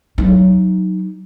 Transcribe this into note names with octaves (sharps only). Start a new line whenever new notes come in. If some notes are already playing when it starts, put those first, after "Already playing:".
F#3 D#4